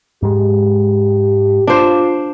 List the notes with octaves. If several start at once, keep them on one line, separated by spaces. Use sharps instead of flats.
G#2 G#3 G4
D4 F4 C5